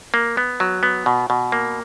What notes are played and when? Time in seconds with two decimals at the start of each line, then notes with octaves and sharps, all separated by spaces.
0.14 A#3
0.37 B3
0.60 F#3
0.83 B3
1.06 B2
1.30 B2
1.52 A#3